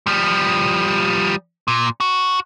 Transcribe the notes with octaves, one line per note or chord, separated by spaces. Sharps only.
F3 G3
A#2
F#4